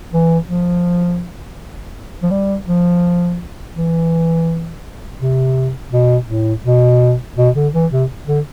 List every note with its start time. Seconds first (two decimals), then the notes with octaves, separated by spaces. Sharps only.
0.13 E3
0.49 F3
2.23 F3
2.31 G3
2.66 F3
3.75 E3
5.20 C3
5.92 B2
6.28 A2
6.64 B2
7.37 B2
7.55 D3
7.73 E3
7.92 C3
8.27 D3